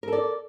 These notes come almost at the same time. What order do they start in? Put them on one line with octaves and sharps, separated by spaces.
A#4 A4 D5